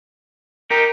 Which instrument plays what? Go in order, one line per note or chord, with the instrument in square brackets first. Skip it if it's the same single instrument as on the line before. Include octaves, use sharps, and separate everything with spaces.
[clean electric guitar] D#4 G4 [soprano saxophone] A#4